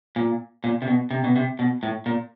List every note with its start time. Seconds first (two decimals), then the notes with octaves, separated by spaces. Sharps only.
0.16 A#2
0.64 A#2
0.82 C3
0.88 B2
1.11 C3
1.24 B2
1.36 C3
1.59 B2
1.83 A2
2.06 A#2